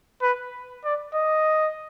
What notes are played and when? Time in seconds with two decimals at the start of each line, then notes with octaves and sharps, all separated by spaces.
0.22 B4
0.85 D5
1.15 D#5